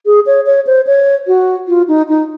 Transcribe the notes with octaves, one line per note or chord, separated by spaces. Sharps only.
G#4
C#5
C#5
C5
C#5
F#4
F4
D#4
D#4